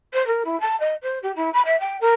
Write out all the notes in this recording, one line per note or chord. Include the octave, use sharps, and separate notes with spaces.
C5
A#4
E4
A5
D#5
C5
G4
E4
B5
E5
G5
A#4